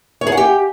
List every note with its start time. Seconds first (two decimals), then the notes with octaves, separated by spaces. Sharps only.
0.21 C#5
0.27 G#4
0.32 F#5
0.37 G4